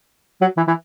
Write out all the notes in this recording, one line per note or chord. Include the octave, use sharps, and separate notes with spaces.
F#3
E3
E3